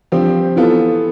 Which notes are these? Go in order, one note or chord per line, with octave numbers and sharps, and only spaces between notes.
G2 F3 C4 G4
E3 B3 F4 A4